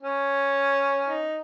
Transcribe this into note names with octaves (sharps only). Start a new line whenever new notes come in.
C#4
D#4